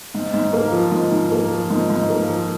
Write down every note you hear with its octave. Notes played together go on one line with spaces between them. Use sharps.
G#2
G#2
A#3
F3
G#2
G#2
A#3
F3
G#2
G#2
A#3
F3